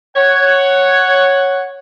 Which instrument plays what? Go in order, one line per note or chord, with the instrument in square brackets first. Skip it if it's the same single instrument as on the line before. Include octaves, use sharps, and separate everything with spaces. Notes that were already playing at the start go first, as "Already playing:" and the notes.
[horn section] C#5 F#5